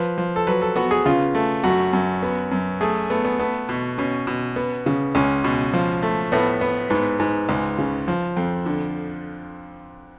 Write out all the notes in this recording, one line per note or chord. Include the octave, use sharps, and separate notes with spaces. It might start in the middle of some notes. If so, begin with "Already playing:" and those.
Already playing: F3 B4
F3
A4
F#3 B4
A4
B3 F#4
G#4
C#3 F4
A3
F#2 F#4
F#2
B3
F#2
A3 G#4
A3 B3
B3
A3 B3
B2
B2 C#4
B2
B3
C#3
C#2 C#4
B2
F3
A3
A2 B3
B3
G#2 B3
G#2
C#2
C#3
F3
F2
D3